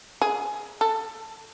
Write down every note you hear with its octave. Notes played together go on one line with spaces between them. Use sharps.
G#4
A4